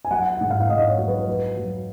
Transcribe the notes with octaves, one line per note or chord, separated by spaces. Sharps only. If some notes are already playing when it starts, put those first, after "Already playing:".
G#5
F#3 F#5
F#5
G#2
F5
G#2 D#5
C#5
F#3
B4
F#3
F#3